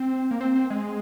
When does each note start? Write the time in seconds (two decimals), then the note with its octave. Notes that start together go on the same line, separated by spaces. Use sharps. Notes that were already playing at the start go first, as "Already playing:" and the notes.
Already playing: C4
0.31 A#3
0.41 C4
0.56 C4
0.70 G#3